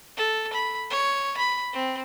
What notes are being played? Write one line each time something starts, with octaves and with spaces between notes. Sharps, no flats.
A4
B5
C#5
B5
C4